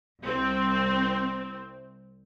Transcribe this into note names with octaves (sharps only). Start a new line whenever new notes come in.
C2 C4